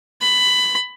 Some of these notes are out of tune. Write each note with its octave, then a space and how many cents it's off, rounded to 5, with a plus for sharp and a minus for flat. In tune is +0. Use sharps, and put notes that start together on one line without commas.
B5 +15